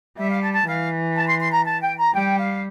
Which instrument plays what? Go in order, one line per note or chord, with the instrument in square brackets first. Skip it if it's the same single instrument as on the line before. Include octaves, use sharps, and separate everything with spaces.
[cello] G3 [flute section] E5
[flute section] F5
A5
A5
[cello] E3 [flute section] F5
[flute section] A5
C6
C6
A#5
A5
G5
A#5
[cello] G3 [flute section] G5
[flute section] F5